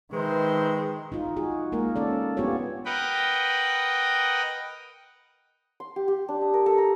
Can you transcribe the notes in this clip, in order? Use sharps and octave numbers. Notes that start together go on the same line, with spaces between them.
D#3 G#3 D#4 B4 C5 E5
D#4 F4
F#4 G#4
G#3 A#3 A#4
C#4 A4 D5
B3 D4 F4 G4 G#4 C#5
A#4 B4 D#5 F#5 G5 B5
C6
G4
G4
D4
D#5
A#4
A4
A#5